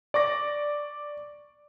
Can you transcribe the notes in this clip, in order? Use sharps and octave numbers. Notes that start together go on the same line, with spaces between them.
D5 C#6 D6 A#6